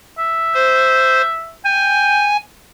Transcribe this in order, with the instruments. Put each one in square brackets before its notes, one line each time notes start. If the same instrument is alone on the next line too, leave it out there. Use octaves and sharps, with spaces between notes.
[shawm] E5
[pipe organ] C5
[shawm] G5 [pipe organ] G#5